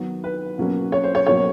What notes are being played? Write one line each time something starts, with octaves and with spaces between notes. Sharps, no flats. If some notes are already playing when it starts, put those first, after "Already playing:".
Already playing: D#3 F#3 B3
B4
B2 F#3 A#3 C#4
C#5
C5
C#5
B2 F#3 A#3 C#4 C#5